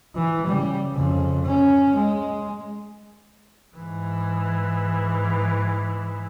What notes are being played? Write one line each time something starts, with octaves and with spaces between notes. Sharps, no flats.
E3
C#3 G3
F2 C#3
C#4
G#3
G#2 E3